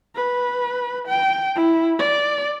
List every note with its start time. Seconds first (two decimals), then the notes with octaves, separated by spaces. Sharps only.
0.16 B4
1.07 G5
1.56 E4
1.99 D5